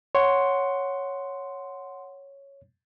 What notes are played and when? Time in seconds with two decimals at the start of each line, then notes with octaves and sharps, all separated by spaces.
0.15 C#5 F#5 C6